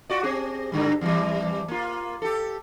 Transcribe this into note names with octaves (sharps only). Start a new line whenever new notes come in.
F4 F#4 D5
C4 G4 G#4
G2 D3 G3
E2 E3 G3
A#3 F4
G4 A4